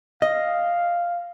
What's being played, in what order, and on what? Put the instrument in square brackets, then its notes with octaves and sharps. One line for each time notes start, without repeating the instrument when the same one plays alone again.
[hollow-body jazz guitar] D#5 [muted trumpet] F5